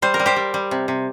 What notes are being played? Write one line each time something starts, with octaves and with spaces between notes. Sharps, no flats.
G3 C5
A#4
G3
G4 C5
G3
G3
C3
C3